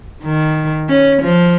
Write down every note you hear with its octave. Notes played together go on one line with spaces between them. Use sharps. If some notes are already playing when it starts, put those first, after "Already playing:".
D#3
C#4
F3